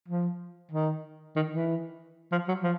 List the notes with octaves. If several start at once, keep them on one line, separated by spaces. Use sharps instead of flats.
F3
D#3
D#3
E3
F3
F#3
F3